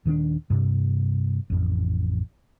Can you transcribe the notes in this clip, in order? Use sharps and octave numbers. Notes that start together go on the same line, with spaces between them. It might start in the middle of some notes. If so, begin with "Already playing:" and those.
D#1 D#3 C4 D4
G2 C3
A1 F2